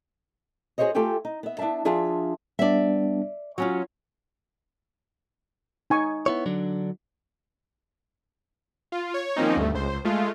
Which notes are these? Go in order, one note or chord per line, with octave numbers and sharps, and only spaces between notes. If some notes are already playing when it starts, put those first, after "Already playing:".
F#4 G#4 A4 C5 C#5 D#5
A3 F4 G4 A4 G5 G#5
D#4
B3 E5
B3 D4 E4 E5 A5
F3 D4 F4 G#4 E5
G3 B3 D4 D5 E5
F#3 C#4 F4 F#4
D#4 G#5 C#6
B3 E4 C#5
D3 F#3 D4
F4
C#5
D#3 F3 A#3 C4 C#4 D#4
D2 G2 A3
C#2 C5
G#3 A3 F4